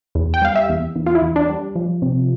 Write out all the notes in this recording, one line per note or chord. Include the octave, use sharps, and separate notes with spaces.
E2
G5
G3 F5
E5
E2
E2
F4
E4
E2
D4
G3
F3
C3